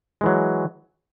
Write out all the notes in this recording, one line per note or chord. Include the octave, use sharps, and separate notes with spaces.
E3 F#3 G#3